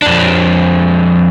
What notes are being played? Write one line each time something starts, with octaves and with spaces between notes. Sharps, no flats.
F2 D4